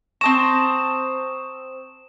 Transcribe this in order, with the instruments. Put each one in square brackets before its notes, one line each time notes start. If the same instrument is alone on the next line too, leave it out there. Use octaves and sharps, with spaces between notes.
[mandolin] C4 A5 A#5 [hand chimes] C#6 D#6 [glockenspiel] E7